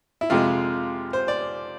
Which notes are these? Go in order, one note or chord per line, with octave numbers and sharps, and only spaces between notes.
E4
F2 C3 G#3 F4
C5
D5